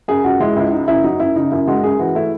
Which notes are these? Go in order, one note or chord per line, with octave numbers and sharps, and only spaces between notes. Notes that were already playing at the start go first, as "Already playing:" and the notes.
F#2 G#4
C#2 F#4
G#3 E4
C#2 E4
C#3 D#4
F#2 E4
F#3 D#4
F#2 E4
C#3 D#4
F#2 E4
G#3 F#4
F#2 G#4
E3 F#4
A3 E4